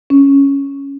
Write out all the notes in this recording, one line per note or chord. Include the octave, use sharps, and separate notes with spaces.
C#4